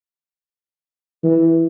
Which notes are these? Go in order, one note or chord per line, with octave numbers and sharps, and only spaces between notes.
E3